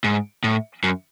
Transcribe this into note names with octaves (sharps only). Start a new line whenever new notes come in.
G#2
A2
F#2